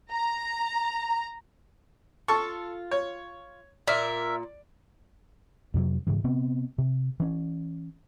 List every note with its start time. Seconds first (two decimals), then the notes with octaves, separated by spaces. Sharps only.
0.11 A#5
2.28 F4 A4 A5 C#6
2.91 C#5
3.88 A#2 A#4 D5 E5
5.74 F2 C3 F#3
6.07 G#2 C#3 E3
6.24 C3 B3 C4
6.78 C3
7.20 E3 C#4